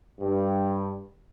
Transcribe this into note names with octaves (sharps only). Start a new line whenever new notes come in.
G2